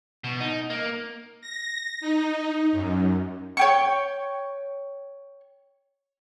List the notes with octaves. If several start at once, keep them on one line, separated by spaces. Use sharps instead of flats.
B2
D#4
A#3
A#6
D#4
F#2
C#5 G5 C#6